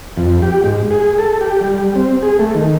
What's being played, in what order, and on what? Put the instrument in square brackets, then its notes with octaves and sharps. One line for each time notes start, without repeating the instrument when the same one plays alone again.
[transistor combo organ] F2
G4
G#2
G#4
A4
G4
G3
C4
G#4
A3
D#3